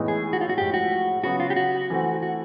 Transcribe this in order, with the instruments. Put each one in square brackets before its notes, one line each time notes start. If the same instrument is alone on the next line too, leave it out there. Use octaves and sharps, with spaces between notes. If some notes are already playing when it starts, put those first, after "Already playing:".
Already playing: [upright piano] A2 E3 G#3 B3 D#4
[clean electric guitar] G#4
F#4
F4
F#4
[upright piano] A2 F3 G#3 [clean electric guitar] G4
[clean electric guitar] F#4
[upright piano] C#3 F#3 B3 [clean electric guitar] F#4
[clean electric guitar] F4
G4
F#4
[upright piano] E3 A3 C4
[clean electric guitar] F#4